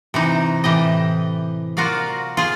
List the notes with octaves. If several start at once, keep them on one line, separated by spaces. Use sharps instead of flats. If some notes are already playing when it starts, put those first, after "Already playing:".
C3 E3 D#4
A2 E3 G4 D#5
F4 F#4 A#4 D5 F5
F4 G#4